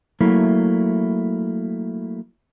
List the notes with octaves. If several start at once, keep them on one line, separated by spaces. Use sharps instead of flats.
F#3 A3 A#3 E4